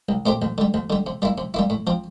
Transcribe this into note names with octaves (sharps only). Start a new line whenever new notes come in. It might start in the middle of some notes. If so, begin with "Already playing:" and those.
C2
A#2 A3 C4 G4
D2
D3 G3
D2
D3 G3
C3
G3 A#3 E4
C3
G3 A#3 E4
A2
F3 C4